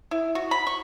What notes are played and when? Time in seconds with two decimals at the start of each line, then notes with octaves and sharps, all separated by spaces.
0.11 E4
0.35 F#4
0.51 B5
0.67 C#6